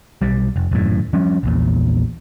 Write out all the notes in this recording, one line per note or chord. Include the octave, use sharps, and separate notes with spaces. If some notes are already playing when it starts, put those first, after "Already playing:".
B1 G3
F1
D#1 F#2 A2
F3 G3 C#4
A#1 E2 A#2